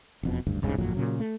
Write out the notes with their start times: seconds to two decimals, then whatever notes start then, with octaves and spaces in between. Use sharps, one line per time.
0.23 E1 F2 B2
0.47 F#1 D2 G2
0.62 E1 C2 G#2 C#3
0.78 G1 F2 A#2 F#3
0.95 A#2 C#3 F#3
1.20 A3